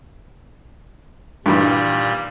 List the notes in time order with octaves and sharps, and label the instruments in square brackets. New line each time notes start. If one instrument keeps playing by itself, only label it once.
[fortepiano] G2 D#3 E3 [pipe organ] A#2 G3